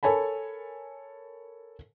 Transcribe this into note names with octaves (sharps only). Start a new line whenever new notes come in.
A4 A#4 C#5 G#5 A5 B5